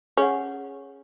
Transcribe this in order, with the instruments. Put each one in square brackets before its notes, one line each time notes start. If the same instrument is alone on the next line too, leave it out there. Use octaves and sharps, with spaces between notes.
[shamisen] C#4 [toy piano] G#4 C#5 F#5